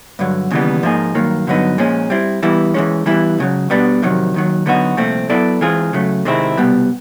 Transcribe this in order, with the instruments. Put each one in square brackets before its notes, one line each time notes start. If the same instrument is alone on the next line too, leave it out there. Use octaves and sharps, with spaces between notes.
[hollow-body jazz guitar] G2 D3 F#3
D#2 C#3 E3 G3 B3
G#2 F3 A#3 D#4 G#4
G2 D#3 F#3 A#3
G2 D3 F#3 B3 D#4
A#2 F3 G#3 C#4
G3 C4 E4
E3 G3 B3 E4
E3 G#3 C#4
E3 G3 B3 E4
C#2 C#3 F#3
B2 G3 B3 D4
F2 C3 D#3 F#3
D#2 D#3 F#3
D3 F#3 B3 D#4 F#4
C2 A#2 F3 A3 C4
F#3 B3 E4 A4 D5
E3 G#3 C4 F4 G#4
C#3 F#3 A3
C3 D#3 G#3 C4 E4
C2 B2 G3 B3